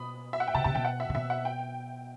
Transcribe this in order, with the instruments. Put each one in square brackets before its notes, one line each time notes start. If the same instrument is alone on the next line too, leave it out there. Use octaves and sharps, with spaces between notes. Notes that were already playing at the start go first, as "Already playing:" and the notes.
Already playing: [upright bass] B2 [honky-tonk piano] B5 D#6
[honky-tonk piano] E5
F#5
G5
[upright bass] C3 [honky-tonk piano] A5
[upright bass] C3 [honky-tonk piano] A5
[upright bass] B2 [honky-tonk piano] G5
[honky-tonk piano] F#5
E5
[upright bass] C3
[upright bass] B2 [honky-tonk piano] E5
[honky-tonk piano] F#5
G5